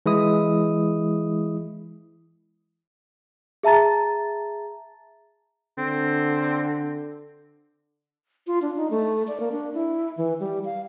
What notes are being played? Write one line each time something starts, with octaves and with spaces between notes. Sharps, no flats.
E3 G#3 E4 D#6
G#4 E5 A5 A#5 A6
D3 C4
F4
D4
D#4
A3
D5
A#3
D4
E4
E3
G3
F5